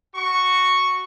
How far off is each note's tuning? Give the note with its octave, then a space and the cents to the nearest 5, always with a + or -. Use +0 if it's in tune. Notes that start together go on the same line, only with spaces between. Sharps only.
F#4 +0 C#6 +0